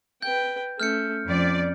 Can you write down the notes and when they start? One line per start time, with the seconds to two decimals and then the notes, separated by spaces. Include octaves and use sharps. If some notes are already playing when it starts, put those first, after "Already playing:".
0.22 B4 G5 G6
0.80 A3 C#4 F6 G6 C#7
1.26 F2 C#4 D5